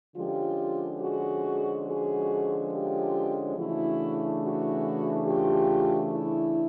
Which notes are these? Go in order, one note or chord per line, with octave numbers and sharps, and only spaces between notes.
D3 F3 G#3 C#4 F4 G4
F#4 G#4
F#4 G#4
F4 G4
C#3 E3 A3 D4 E4 F#4
E4 F#4
F4 G4
E4